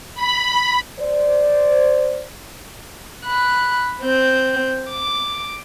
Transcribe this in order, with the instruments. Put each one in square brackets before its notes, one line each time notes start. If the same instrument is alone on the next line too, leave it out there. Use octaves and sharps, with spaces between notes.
[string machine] B5
[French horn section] C5 D5
[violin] B5 F#6
C4 G6
D6